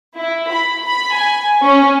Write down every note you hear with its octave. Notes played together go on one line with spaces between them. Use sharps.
E4
B5
B5
G#5
C#4